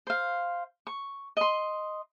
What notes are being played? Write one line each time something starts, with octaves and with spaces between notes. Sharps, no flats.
C5 F5
C#6
D#5 C6